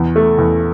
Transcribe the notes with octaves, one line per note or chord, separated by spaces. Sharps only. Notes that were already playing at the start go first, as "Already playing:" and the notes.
Already playing: E2
A3
E2